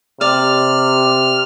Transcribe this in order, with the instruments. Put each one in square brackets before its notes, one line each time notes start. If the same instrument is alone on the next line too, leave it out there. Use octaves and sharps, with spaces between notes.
[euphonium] C3 [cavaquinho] D5 [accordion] F6